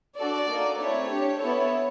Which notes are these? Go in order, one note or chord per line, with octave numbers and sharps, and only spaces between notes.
D4 F#4 A4 D5
A#3 D#4 F#4 A4
A3 C4 E4 C#5
D4 G4
B3 E4 A4 C#5